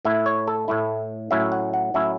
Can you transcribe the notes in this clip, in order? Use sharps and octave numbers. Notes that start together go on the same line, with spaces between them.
A2 A3 E4 E5
C#5
A4
A2 A3 E4
A2 F#3 C#4 E4 E5
F#5
F#5
A2 F#3 C#4 E4 E5